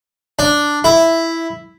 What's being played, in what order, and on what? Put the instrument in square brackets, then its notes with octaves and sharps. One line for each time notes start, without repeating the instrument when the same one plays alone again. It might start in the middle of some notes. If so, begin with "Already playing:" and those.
[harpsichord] D4
E4